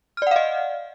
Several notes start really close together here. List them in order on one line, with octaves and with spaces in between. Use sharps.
F6 D5 F#5 F5 D#5